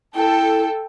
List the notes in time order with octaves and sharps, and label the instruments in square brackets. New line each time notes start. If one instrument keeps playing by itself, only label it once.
[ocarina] E4 [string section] A4 [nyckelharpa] G5